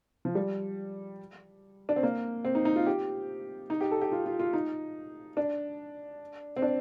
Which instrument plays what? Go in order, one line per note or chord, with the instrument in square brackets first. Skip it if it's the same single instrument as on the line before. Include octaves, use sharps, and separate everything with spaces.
[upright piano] F3
G3
D4
C4
A#3
C4
D#4
D#4
F4
G4
D#4
G4
A4
G4
F4
F4
F4
D#4
D4
C4
D4